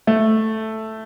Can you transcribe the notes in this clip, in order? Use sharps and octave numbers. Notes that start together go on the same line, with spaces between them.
A3